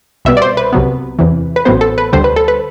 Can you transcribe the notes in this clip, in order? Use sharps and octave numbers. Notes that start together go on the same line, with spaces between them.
C2 B2 G3 B3 E5
D5
C5
B4
C2 C3 F#3 B3
E2 C3 E3
B4
A1 A2 F#3 B3 C5
A4
B4
D2 D3 G3 C5
B4
A4
B4